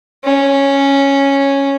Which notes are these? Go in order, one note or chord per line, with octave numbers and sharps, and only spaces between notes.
C#4